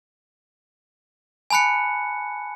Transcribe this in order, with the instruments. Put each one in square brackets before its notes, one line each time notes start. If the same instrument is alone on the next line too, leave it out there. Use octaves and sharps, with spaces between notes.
[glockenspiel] G#5 A5 B5 F#6 C#7